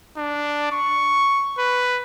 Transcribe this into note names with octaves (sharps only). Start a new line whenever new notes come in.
D4
C#6
B4